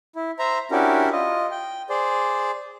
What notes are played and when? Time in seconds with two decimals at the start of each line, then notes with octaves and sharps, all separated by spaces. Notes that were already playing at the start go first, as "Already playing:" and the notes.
0.16 E4
0.39 C5 E5 A#5
0.71 C#4 D4 E4 F#4 G4 A#4
1.13 F4 D#5
1.51 G5
1.90 G#4 C5 D5